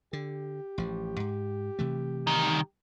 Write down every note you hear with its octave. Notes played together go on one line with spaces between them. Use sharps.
D3 G4
A1 F3
G#2
C3 E3 A3
C2 D#3